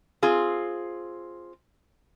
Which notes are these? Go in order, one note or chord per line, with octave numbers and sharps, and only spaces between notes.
C4 F4 G#4